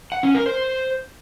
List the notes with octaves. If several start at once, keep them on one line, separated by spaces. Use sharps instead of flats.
F#5
C#4
A#4
C5